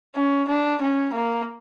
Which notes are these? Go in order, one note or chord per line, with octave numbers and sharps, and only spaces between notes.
C#4
D4
C#4
A#3